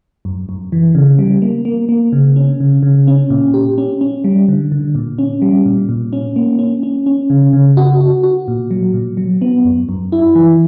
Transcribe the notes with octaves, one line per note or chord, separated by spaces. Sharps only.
F#2
F#2
E3
C#3
G3
A#3
A#3
A#3
C#3
C#4
C#3
C#3
C#4
A#2
G4
C#4
C#4
G3
D3
D3
A#2
C#4
G3
A#2
A#2
C#4
A#3
C#4
C#4
C#4
C#3
C#3
F#4
F#4
F#4
A#2
F#3
A#2
F#3
B3
F#2
F#2
E4
E3